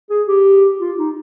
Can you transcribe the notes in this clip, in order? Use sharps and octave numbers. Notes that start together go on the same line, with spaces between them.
G#4
G4
F4
D#4